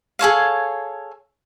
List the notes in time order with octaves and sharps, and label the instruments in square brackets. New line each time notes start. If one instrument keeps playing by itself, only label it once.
[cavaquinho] G#4 A4 C#5 F5